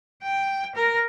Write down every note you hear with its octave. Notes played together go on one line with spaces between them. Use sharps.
G5
A#4